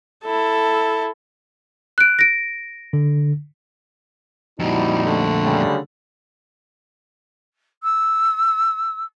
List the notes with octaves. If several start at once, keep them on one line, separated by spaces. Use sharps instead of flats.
E4 A4
F#6 D7
A#6 D7
D3
F2 A#2 G3 D#4 E4 F#4
D3 A3
C#3 F#3 G3
E6